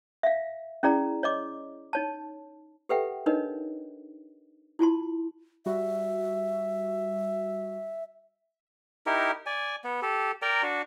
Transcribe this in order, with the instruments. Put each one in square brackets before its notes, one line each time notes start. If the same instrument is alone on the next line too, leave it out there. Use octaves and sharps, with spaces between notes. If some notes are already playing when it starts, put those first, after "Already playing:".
[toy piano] E5 F5
C#4 E4 G#4 D5 A#5
C#5 D#5 D6
D#4 C#5 A5
G4 A4 B4 E5 F#5 G5
D4 D#4 A#4 B4 C#5 D#5
E4 F4 A5 C6
[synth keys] G3 F#4 [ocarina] E5
[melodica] D#4 E4 G4 A#4
D5 G#5
B3
G4 A4
A#4 D5 G5 A#5
D4 F#4